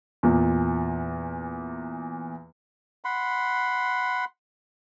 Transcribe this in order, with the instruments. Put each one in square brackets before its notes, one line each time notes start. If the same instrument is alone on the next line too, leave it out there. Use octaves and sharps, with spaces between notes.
[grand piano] E2 A#2
[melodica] F#5 B5 C6